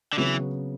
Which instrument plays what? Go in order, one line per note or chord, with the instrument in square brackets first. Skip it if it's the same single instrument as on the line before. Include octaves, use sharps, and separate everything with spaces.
[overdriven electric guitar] D3
[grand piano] C#3 F#3 B3 F#4 [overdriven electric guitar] E3